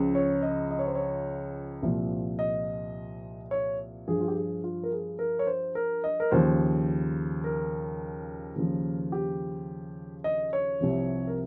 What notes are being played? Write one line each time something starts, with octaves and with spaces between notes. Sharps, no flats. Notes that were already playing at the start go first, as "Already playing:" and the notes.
Already playing: C#2 C#3 F3
C#5
D#5
D#5
C#5
C5
C#5
C2 A#2 F3
D#5
C#5
G2 F3 G#4
F4
G4
G#4
F4
A#4
G#4
A#4
C#5
C5
A#4
D#5
A#4
D#2 C#3 F3 C5
A#4
D#2 C#3 F3
G4
D#5
C#5
C2 C3 F3
A#4